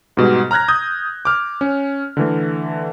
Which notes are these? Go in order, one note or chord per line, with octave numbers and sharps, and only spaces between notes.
G#2 B2 G3
A#5 F6 F#6 G#6 A#6
D#6 G6 G#6
D6 F6
C#4
D3 E3 A3